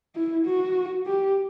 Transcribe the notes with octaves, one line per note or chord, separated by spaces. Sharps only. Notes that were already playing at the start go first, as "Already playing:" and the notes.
E4
F#4
G4